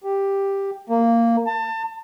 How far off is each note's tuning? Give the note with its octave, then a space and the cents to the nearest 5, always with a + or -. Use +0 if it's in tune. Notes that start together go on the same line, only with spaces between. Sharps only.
G4 +5
A#3 -10
A5 +30